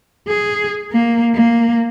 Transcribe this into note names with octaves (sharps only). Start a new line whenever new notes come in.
G#4
A#3
A#3